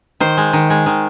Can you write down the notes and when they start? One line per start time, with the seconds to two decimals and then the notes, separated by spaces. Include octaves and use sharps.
0.20 D#3 C5
0.37 G#3
0.53 D#3
0.70 G#3
0.86 D#3